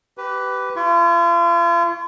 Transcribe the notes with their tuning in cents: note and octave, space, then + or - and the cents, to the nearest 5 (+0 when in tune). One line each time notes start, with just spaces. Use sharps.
G4 -20 B4 +10
F4 -40 C#6 +0